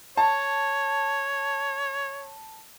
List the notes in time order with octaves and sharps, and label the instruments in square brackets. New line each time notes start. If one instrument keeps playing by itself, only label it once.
[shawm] C#5 [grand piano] A5